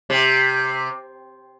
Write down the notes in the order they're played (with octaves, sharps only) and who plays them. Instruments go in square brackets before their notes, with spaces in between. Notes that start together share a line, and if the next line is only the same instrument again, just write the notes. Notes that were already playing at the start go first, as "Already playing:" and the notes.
[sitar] C3